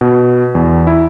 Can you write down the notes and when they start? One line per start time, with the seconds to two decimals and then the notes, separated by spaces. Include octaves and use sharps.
0.01 B2
0.55 E2
0.87 E4